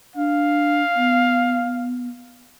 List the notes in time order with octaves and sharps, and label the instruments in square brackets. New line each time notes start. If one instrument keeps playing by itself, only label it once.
[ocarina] D4 [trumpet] F5
[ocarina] B3